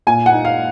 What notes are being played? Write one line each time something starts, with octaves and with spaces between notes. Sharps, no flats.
A#2 G#5
F#5
D#4
F5